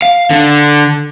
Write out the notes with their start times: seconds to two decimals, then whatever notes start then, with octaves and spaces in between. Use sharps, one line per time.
0.02 F5
0.31 D3